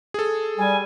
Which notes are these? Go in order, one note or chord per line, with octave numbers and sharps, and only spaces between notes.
G#4 A4
G3 G#5